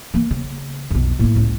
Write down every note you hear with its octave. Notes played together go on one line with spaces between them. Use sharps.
E3 A#3
C#3
B1 F2
A2 A#3 E4
C#2